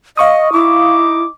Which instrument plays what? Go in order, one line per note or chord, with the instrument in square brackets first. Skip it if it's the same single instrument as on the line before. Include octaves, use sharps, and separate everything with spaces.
[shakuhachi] D#5 [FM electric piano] F5 C#6 D#6
[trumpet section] D#4 D6 [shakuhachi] E4